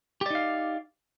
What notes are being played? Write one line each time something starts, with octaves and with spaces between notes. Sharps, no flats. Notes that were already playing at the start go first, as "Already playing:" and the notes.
D#4 G4 D5 F5